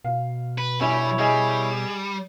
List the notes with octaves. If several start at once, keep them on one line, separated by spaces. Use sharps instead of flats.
B2 F5
B4
G1 G3 E4 C#5 G#5
G3 G#4 D#5 G#5